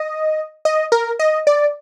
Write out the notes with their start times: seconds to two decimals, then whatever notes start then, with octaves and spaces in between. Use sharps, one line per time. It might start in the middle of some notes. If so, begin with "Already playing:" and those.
Already playing: D#5
0.65 D#5
0.92 A#4
1.19 D#5
1.47 D5